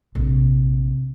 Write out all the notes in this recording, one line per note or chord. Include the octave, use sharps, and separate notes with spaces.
A#1 C3